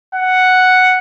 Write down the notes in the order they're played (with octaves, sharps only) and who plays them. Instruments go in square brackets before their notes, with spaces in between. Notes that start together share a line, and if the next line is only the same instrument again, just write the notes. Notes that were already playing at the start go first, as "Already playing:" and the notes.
[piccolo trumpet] F#5